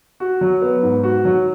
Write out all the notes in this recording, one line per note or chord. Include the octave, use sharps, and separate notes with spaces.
F#4
F#3
B3
G#2
F#4
F#3